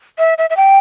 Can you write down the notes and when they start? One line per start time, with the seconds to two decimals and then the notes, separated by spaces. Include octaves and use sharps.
0.19 E5
0.38 E5
0.50 E5
0.57 G5